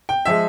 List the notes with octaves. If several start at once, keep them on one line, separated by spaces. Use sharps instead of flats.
G5
F3 G#3 E5